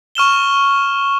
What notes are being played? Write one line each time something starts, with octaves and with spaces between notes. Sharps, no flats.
C#6 F6 E7 G7